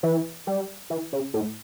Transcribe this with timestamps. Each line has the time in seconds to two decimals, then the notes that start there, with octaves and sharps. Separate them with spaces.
0.03 E3
0.47 G3
0.90 E3
1.13 C#3
1.34 A2